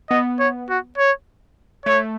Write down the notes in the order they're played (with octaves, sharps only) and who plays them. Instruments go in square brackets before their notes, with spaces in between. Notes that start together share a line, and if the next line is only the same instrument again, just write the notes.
[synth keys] B3 [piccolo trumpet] D#5
[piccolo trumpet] C#5
F#4
C#5
[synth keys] A3 [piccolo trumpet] C#5